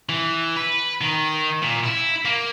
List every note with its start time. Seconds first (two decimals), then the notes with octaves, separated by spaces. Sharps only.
0.09 E3
0.57 B4
1.01 D#3
1.62 A#2
1.84 E4
2.25 A#3